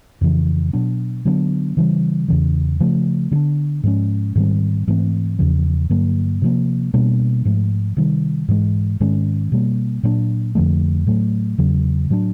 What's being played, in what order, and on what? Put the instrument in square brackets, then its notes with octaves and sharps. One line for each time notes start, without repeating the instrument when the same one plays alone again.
[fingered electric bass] F2 C#3 E3
B2 F#3 B3 D4
D3 F#3 B3 D4
C#3 E3 G3
E2 C#3 E3
C#3 F3 A3
D3 F#3 B3 D4
G#2 F3 G#3 C#4
G#2 D#3 G3 C4
G#2 E3 A3 C4
E2 C#3 F3
G2 D3 F#3 A#3
C3 F3 A#3
B2 G3 A#3 D4
G#2 F3 A3
C3 D#3 G3
G#2 E3 G#3
G#2 D#3 G#3 C#4
B2 G3 A#3
A#2 F#3 A#3 D4
F2 D3 F3 A3
A2 F#3 A3
E2 C#3 F#3
A2 F#3 B3 D4